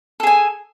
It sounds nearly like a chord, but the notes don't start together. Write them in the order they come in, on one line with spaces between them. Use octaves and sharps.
A4 G#4 G#5